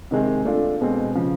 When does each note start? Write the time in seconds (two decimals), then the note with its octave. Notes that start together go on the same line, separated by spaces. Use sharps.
0.11 C3 D#3 G#3 C4
0.45 A3 D4 F4
0.81 B2 G#3 C4
1.15 C#3 F3